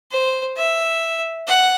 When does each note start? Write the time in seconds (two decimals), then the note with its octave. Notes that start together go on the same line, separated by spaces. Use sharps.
0.11 C5
0.56 E5
1.47 F#5